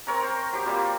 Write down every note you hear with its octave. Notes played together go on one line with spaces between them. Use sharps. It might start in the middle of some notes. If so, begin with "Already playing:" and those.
C4 A#4 C#5 A#5
C5
F#3 G4
G3 A#3 C4 F4